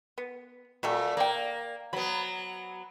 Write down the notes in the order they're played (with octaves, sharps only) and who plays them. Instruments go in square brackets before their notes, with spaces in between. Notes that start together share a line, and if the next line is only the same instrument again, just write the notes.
[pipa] B3
[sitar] A#2 [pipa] F#3 G3 A3
[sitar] A#3 [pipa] D5 G5
[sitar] F#3 B3 [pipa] B5